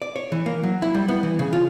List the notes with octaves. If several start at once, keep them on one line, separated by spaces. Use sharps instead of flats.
D5
C#5
E3
A#3
F#3
E4
G3
B3
E3
C#3
F4